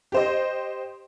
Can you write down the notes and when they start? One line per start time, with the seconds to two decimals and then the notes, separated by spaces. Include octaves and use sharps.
0.12 G4 C5 D#5